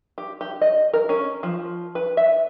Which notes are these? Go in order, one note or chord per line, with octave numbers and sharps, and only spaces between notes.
G4
G4
D#5
A#4
C#4
F3
B4
E5